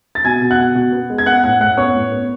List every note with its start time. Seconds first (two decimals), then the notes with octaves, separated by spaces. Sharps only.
0.15 A6
0.24 B2 G#5 G#6
0.42 B2
0.50 F#5 F#6
0.59 B2
0.75 B2
0.92 B3
1.10 G#3
1.18 G#6
1.26 B3 F#5 F#6
1.43 A2 F#5 F#6
1.60 A2 F#5 F#6
1.77 B3 C#5 C#6
1.95 A2
2.12 B3